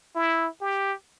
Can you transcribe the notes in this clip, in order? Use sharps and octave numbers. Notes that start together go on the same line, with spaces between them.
E4
G4